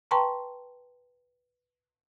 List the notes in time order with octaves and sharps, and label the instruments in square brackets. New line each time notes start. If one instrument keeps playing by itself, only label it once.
[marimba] B4 G5 A5 A#5 C6 C#6